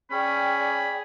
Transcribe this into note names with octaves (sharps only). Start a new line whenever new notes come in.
C#4 G#4 D5 G5 B5